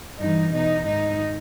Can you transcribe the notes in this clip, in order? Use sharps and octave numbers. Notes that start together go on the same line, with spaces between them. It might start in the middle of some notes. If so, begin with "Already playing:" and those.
G2 E3 D#4
E2 B2 D#4
G#2 D#3 D#4